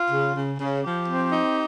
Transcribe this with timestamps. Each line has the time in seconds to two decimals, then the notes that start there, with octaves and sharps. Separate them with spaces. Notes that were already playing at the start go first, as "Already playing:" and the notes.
Already playing: F4
0.11 C#3
0.35 C#3
0.59 C#3
0.84 F3 G4
1.08 C4
1.32 D#4